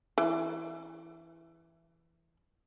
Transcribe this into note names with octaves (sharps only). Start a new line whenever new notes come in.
E3